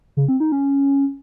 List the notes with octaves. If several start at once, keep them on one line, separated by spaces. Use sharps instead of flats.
C#3
C4
D#4
C#4